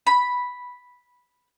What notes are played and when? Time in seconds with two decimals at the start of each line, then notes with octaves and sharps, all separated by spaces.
0.07 B5